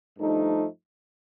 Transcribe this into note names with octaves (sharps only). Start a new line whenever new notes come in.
G2 F3 A3 D#4